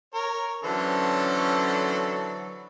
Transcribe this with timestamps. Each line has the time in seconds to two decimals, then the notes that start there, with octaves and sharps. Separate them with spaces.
0.14 A#4 C#5
0.64 D3 E3 F#3 C#4 A4 C5